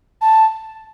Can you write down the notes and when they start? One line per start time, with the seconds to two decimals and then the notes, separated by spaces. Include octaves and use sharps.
0.21 A5